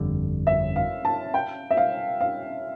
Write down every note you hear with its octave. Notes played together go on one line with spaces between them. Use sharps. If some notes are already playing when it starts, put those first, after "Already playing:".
Already playing: G1 F2 D3 G3
E5
F5
A5
G5
E5
F5
F5